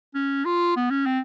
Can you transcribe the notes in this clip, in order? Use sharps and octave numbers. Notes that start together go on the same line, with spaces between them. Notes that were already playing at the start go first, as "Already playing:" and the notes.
C#4
F4
B3
C#4
C4